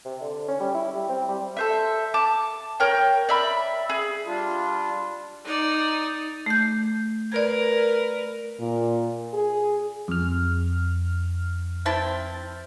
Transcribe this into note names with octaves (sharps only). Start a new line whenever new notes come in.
C3
D3
C#4
G3
E4
G3
C4
G3
A4 C5 E5
A5 D6
A#4 C#5 G5
D5 E5 B5
G#4
G3 D4 F4
D#4 D5
A3 G6
A#4 B4 D5 G#6
A#2
G#4
F2 F6
C4 E4 A5